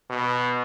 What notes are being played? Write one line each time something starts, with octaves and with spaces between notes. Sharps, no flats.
B2